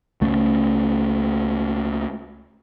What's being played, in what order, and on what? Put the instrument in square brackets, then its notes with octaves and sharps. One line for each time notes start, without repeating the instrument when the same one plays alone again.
[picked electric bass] C#2 A3 C#4